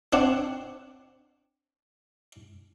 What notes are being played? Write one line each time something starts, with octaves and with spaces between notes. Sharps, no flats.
C4 D4 F#5